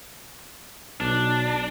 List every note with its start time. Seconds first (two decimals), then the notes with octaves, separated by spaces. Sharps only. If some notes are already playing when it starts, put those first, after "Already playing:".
1.00 B1 D4